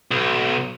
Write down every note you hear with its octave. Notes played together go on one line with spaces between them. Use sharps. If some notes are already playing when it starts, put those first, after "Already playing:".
B1